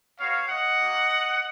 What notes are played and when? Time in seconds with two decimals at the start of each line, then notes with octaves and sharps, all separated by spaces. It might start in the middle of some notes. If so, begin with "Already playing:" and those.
0.20 B3 F#4 C#5 F5
0.49 D#5 F#5
0.79 A#3 D#4 F#4